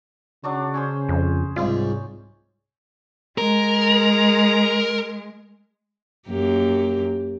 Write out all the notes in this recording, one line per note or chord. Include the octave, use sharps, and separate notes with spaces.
C#3 F#3 D4 C#6
C#4 G#4 C5
F2
C2 G#2 F4
G#3 A#4
F#2 A#3 G4